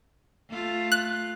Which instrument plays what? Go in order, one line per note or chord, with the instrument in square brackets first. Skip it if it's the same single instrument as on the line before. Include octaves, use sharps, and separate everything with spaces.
[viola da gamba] A3 F4
[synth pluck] F#6